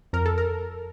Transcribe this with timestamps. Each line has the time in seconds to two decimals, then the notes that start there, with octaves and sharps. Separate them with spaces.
0.13 F2 A#4
0.26 A4
0.38 A#4